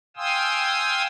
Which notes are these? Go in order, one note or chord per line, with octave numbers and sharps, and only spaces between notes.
F5 G5 G#5 C6 D#6 E6